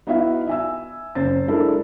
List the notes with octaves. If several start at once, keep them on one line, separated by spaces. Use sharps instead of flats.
B3 D#4 E4 F#4 E5 F5
E5 G#5 E6
F#1 C5 A6
G#3 D4 E4 A4 A#4